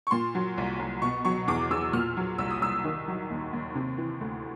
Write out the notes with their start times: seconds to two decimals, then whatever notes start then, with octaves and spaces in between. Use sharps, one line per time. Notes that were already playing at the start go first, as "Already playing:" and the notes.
0.07 C#6
0.11 A#2 C6
0.35 F#3
0.58 C2
0.79 C2
1.02 B2 C#6
1.25 F#3 C#6
1.48 E2 D6
1.71 E2 E6
1.93 A#2 F6
2.17 F#3
2.38 C2 E6
2.51 D#6
2.61 C2 E6
2.84 D#3
3.08 F#3
3.30 D#2
3.53 D#2
3.75 C3
3.98 E3
4.21 D2